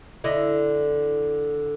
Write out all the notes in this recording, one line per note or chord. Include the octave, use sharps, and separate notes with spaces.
D3 E4 D#5